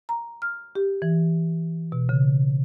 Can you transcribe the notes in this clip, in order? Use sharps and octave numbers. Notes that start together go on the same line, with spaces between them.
A#5
F6
G4
E3
B2
C#3